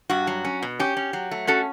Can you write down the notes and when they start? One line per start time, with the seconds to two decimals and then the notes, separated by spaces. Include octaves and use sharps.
0.10 G2 F#4
0.27 F#3
0.45 C#4
0.63 B2
0.79 C#4 G4
0.97 C#4
1.13 F#3
1.31 A3
1.47 C#4 F#4 A4